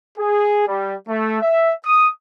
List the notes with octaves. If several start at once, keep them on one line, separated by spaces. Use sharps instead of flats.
G#4
G3
A3
E5
D#6